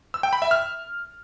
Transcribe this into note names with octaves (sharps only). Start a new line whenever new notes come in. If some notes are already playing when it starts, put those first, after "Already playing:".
E6
G5
B5
E5
F6